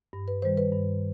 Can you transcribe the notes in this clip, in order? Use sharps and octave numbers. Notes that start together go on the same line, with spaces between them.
G2
B4
D#3 G3 C5
B4
G2